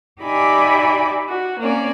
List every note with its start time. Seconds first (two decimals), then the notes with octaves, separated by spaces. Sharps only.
0.22 D#4 G4 D5 E5 G#5 B5
1.29 F#4
1.59 A#3 C4 C#4 D5